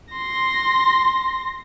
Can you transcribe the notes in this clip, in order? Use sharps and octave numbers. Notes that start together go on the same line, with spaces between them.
C6 A#6